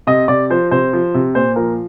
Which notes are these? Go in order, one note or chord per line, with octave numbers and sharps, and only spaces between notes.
C3 D#5
C3 D5
F3 C5
C3 C5
F3
C3
A#2 C5
F3 A#4